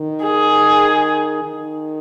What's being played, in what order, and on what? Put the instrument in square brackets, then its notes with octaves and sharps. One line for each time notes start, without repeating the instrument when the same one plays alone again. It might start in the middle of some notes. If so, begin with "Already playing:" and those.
Already playing: [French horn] D#3
[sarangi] G#4
[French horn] D#3